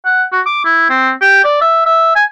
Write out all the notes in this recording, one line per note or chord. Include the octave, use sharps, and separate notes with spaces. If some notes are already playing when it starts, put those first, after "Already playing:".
F#5
F#4
D6
E4
C4
G4
D5
E5
E5
G#5